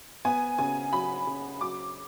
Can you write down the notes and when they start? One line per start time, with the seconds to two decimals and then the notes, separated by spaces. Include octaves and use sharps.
0.25 B3 G#5
0.58 C#3 G#5
0.92 F#3 B5
1.27 C#3
1.61 F#3 D6